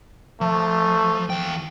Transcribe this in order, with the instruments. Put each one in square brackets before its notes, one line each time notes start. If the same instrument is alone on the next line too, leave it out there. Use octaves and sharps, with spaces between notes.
[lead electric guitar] F3 [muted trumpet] A3
[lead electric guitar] E2 G5